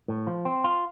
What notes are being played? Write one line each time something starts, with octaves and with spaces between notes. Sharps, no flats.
A2
F3
C4
F4